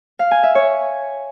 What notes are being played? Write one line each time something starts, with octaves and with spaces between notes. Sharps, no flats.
F5
G#5
E5
C#5